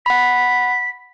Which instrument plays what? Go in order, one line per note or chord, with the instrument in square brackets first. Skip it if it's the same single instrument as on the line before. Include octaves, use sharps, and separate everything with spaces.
[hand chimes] F#5 B5 [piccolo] B6